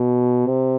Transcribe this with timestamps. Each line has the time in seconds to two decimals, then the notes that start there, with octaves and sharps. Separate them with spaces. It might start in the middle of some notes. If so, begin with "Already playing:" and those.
Already playing: B2
0.47 C3